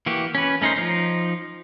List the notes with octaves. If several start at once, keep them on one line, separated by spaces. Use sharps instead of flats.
E3 A#3 F#4 G4
C#4 B4
A3 C#4 D#4 A#4 C5
F3 D#4